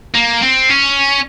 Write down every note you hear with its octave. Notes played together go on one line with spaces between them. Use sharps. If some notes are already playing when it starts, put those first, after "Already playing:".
A#3
C4
C#4